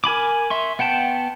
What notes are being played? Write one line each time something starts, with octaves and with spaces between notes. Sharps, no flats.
A#4 G#5 B5 D6
E5 C6 C#6
B3 F#5 G5 A5